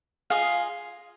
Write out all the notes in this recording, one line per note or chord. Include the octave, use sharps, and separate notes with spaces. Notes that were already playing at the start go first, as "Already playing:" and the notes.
F4 G#4 D#5 F5